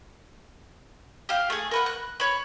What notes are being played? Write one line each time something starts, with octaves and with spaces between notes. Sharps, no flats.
G4 F5
A3 G#4
A#4 B4 F#5
F#6
C#5 B5